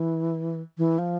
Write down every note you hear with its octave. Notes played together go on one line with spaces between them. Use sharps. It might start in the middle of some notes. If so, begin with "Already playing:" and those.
Already playing: E3
E3
F3